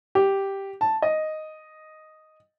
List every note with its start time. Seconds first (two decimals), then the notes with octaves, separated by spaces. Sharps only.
0.15 G4
0.81 A5
1.02 D#5